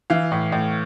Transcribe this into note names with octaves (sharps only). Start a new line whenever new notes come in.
E3 F5
A2
A2